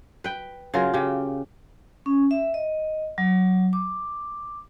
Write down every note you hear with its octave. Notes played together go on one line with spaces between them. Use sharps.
B4 G5
C#3 F#3 F4 A#4
C#3 G4
C#4
E5
D#5
F#3
D6